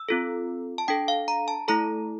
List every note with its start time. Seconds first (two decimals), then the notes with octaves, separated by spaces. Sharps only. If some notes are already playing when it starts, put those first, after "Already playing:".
Already playing: E6
0.09 C4 F4 A4
0.78 A5
0.88 D4 A4 G5
1.08 F5
1.28 A#5
1.48 A5
1.68 A3 E4 A4 A#5